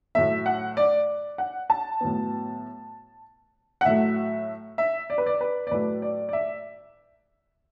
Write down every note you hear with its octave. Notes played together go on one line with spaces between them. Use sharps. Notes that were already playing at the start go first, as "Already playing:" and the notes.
A2 F#3 A3 E5
F#5
D5
F#5
A5
A2 F#3 B3
F#5
A2 F#3 A3 E5
E5
D5
B4
D5
B4
D5
A2 F#3 A3 B4
D5
D5
E5